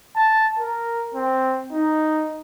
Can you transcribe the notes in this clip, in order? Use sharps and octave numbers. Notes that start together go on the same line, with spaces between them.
A5
A#4
C4
D#4